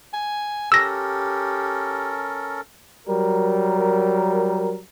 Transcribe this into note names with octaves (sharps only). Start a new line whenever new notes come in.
G#5
C#4 G4 A4 A#4 E6 A#6
F#3 G3 A#4